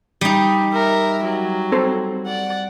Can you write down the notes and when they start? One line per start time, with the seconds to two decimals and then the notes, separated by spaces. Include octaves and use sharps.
0.21 G3 D#4
0.73 A#4 E5
1.24 F#3
1.72 C4 A4 C5
2.26 D5 F#5